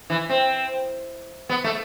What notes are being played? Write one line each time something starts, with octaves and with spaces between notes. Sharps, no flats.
E3
C4
B3
A3